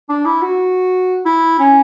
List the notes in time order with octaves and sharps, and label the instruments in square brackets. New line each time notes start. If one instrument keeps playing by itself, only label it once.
[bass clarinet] D4
E4
F#4
E4
C#4